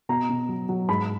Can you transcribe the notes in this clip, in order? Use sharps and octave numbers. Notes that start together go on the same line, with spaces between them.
B2 A#5
B2
F#3
F#3
G#2 B5